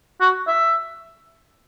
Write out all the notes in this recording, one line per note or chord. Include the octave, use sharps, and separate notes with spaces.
F#4
E5